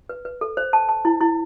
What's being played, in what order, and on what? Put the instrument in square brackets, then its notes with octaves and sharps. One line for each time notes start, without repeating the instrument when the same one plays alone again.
[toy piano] B4
B4
A4
C5
A5
A5
E4
E4